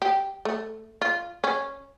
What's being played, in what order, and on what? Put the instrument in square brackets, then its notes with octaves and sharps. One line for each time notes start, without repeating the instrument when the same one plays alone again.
[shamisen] G4
A3
F4
C#4